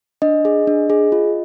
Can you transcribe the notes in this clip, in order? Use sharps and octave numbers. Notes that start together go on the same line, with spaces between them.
D4 D#5
G#4
D4
G#4
F4